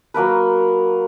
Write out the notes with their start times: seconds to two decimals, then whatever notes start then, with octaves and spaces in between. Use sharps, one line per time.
0.14 F#3 A#3 A#4 B4